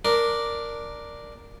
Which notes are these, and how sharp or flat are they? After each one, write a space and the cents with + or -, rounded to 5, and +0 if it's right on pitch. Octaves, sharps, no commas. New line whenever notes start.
D4 +0 A#4 +0